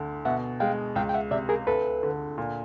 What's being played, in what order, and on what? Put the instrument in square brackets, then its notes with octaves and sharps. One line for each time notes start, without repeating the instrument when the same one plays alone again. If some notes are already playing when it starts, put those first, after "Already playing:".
Already playing: [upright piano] D2 D3
[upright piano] B2 [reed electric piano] E5 F#5
[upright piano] G#3 [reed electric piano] F5 G5
[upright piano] C#2 [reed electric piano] F5 G5
[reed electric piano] G5
E5 F#5
[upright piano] C3 [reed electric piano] D5 E5
[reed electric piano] G#4 A#4
[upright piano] D2 [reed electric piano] A4 B4
[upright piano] D3
A#2